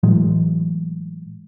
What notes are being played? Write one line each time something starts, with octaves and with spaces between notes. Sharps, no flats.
A2 E3 F#3 G#3